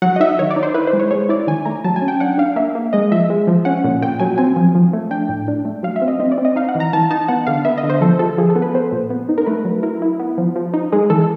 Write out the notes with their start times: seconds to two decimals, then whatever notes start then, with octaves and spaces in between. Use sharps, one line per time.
0.02 F#3 F#5
0.16 D#5
0.20 D#4 E5
0.39 D#3 C#5
0.51 D5
0.56 D#4
0.63 C5
0.74 E4 B4
0.87 C5
0.93 G#3
1.00 C#5
1.11 G#3 C#5
1.29 E4 D5
1.47 D#3 G#5
1.65 A3 A#5
1.84 F#3 A5
1.96 G#5
2.02 C#4
2.08 G5
2.20 D4 F#5
2.38 D4 F5
2.56 A#3 E5
2.75 A#3
2.93 G#3 D#5
3.12 F3 E5
3.30 G#3
3.47 F3
3.65 C#4 F#5
3.84 A#2
4.02 A#2 G5
4.20 F#3 G#5
4.38 C4 G#5
4.56 F3
4.75 F3
4.93 A3
5.11 D4 G5
5.29 A2
5.48 D4
5.65 A3
5.83 F#3 F5
5.96 E5
6.02 C4
6.08 D#5
6.20 C4 D#5
6.32 D5
6.38 C4
6.45 D#5
6.56 D#4 F5
6.69 F#5
6.75 E3
6.80 A#5
6.93 E3 A5
7.10 D#4 A5
7.28 B3 F#5
7.47 D3 F5
7.65 B3 E5
7.78 D#5
7.84 D3
7.90 C5
8.01 F3 A4
8.19 F3 A4
8.38 F3 G#4
8.50 A4
8.56 B3
8.62 B4
8.74 B3 C5
8.92 A#2
9.10 B3
9.29 D#4
9.38 A#4
9.46 A3 B4
9.65 F#3
9.83 E4 A#4
10.02 E4
10.20 B3
10.38 F3
10.56 F3
10.74 D#4
10.92 G#3 G#4
11.10 E3 A4